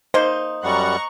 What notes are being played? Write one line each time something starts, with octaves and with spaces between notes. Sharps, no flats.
A#3 D#4 C5
F#2 G3 F#5 A#5 C#6 F#6